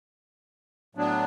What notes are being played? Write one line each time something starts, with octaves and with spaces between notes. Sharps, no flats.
A2 F#3 B3 D4